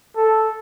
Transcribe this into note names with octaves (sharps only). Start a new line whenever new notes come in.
A4